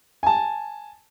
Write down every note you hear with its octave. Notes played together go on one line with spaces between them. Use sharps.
G#5 A5